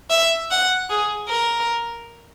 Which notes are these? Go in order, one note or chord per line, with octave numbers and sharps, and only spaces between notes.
E5
F#5
G#4
A#4